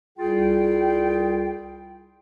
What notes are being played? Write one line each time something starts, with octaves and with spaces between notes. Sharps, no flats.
C2 G3 F4 G#4 G5